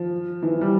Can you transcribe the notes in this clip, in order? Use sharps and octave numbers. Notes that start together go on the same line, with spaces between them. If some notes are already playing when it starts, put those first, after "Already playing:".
Already playing: F3
E3
G3